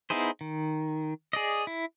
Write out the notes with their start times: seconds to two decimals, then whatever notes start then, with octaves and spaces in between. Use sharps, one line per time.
0.10 B3 D#4 E4 G#4 C5
0.41 D#3
1.33 G#4 D5 D#5
1.67 E4